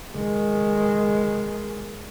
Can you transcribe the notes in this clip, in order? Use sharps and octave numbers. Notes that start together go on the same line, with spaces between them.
D#3 G#3